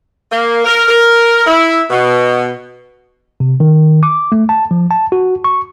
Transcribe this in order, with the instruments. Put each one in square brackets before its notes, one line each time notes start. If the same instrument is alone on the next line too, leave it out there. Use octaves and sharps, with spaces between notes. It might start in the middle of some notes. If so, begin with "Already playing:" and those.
[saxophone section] A#3
A#4
A#4
E4
B2
[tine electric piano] C3
D#3
D6
A3
A5
F3
A5
F#4
C#6